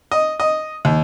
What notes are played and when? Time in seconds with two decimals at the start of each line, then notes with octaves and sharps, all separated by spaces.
0.11 D#5
0.40 D#5
0.85 D#2